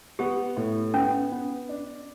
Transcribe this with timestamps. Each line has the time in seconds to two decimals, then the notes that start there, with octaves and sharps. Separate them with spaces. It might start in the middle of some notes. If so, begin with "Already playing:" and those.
0.19 B3 G4
0.57 A2
0.94 B3 C#4
1.32 B3
1.69 D4